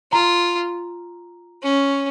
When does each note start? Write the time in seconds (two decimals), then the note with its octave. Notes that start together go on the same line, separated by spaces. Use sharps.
0.12 F4 A#5
1.63 C#4